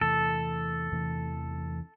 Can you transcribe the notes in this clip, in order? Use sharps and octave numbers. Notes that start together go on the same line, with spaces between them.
E2 C3 E3 A3 A4
E2 C3 E3 A3